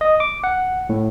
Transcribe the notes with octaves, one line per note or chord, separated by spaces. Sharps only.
D#5
D6
F#5
A2